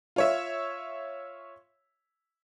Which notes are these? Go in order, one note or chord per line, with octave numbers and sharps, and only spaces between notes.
F4 C#5 E5